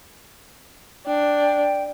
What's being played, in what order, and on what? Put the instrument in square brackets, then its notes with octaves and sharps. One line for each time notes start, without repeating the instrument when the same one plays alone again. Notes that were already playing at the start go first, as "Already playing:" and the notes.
[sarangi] D4 [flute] G5